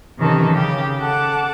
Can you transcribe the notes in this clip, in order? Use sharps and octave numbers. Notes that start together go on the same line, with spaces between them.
C3 D#3 E3 C#4 A4 A#4
C#3 G4
A4 F#5 A5 D6